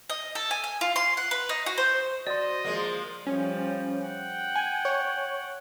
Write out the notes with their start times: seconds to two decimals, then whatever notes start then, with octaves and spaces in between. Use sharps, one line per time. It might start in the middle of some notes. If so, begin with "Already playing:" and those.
0.10 D#5
0.35 A4
0.51 G#5
0.64 G#5
0.81 F4
0.96 C6
1.17 F#5
1.31 B4
1.49 D#4
1.66 F#4
1.78 C5
2.27 F#4 C5 D5 D#5
2.65 F3 G#3 A#3
3.27 F3 G3 C#4
4.06 F#5 G5
4.56 G#5
4.85 C#5